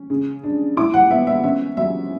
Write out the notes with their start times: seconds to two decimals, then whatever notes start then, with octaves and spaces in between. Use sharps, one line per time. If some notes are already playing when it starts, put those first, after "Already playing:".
Already playing: C#4
0.10 C#3
0.43 D4
0.77 E4 D6
0.94 F#5
1.10 B3 E5
1.27 E5
1.44 C#4 E5
1.77 F#3 E5